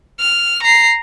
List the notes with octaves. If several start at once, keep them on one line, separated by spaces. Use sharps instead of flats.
F6
A#5 C7